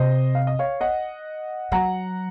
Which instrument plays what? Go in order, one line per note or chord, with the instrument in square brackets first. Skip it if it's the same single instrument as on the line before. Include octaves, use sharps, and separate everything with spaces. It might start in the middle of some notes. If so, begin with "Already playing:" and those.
Already playing: [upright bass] C3 [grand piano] C5 D#5
[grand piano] F5
D#5
C#5 F5
D#5 F#5
[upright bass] F#3 [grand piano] F#5 A#5